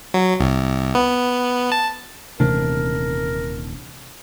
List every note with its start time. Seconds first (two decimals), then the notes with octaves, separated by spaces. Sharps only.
0.14 F#3
0.40 C2
0.95 B3
1.72 A5
2.40 D#1 C3 E3 A3 D4 A#4